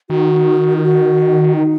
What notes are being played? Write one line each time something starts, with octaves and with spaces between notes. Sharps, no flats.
D#3 F#4
F4
F#4
D#4